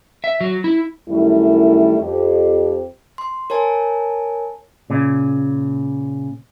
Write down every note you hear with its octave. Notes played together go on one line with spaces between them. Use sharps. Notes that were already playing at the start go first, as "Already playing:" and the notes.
E5
F#3
E4
F#2 D#3 G3 A3 E4
F2 G4
C6
A#4 C#5 G#5 A5
A#2 C#3